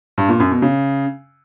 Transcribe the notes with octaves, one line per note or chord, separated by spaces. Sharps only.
G2
A#2
F#2
B2
C#3